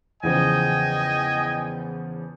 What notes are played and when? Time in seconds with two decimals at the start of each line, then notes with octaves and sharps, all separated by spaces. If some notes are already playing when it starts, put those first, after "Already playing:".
0.23 E2 C#3 F3 D#5 G5 G#5